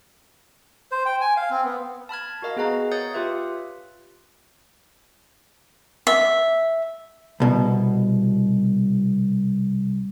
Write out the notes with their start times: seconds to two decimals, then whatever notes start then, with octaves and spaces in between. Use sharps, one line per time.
0.92 C5
1.06 G5
1.21 G#5
1.37 F5
1.50 C4
1.64 B3
2.09 A5 B5 F6 G#6
2.42 F#4 A#4 D#5 F5
2.56 B3 G#4 B4 F5 A#5
2.92 C#5 F5 D#6 G6 A6 C#7
3.14 F4 G4 B4 E5
6.07 E5
7.40 C2 B2